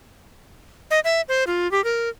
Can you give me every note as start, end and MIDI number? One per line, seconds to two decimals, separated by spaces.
0.91 1.00 75
1.04 1.21 76
1.28 1.44 72
1.47 1.70 65
1.71 1.83 67
1.84 2.09 70